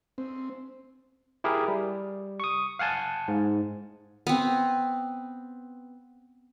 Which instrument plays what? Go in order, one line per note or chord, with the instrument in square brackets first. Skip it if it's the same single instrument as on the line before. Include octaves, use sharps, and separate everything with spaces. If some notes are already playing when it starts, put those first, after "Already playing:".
[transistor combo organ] C4
[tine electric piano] E4 G4 G#4 A#4
G3
C#6 D#6
F5 F#5 G#5 A5
G#2
[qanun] B3 C4